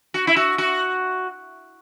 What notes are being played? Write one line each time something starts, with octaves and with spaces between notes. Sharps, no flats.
F#4
E4
F#4
F#4